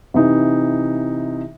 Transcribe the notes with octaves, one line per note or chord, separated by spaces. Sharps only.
C3 E3 D#4